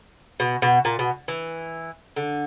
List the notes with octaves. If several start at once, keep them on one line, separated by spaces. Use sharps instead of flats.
B2
B2
A#2
B2
E3
D3